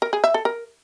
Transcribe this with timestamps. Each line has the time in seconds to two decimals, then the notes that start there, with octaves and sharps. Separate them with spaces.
0.02 A#4
0.13 G#4
0.24 E5
0.34 A4
0.45 A#4